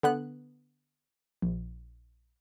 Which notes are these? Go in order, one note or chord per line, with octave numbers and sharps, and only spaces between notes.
D3 B3 F#6
A#1